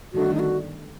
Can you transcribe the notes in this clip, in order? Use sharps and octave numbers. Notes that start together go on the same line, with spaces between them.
G1 G2 D#3 A3 D4 F#4
D#4
F#4